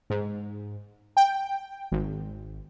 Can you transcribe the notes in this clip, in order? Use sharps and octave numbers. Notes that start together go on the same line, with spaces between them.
G#2
G5
G#1